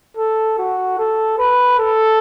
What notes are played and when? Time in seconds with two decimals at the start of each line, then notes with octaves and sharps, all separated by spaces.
0.17 A4
0.58 F#4
0.98 A4
1.38 B4
1.79 A4